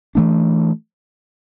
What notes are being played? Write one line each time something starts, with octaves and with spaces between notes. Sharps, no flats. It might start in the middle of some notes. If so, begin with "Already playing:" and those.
E3 A3 D4